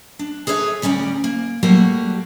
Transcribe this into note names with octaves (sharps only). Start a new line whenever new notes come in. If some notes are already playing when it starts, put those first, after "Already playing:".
D4
G#4 A4 B4 C#5 E5
D2 G3 C#4 D5 A#5
A#3
F#3 G3 A3 A#3 F#4 F#5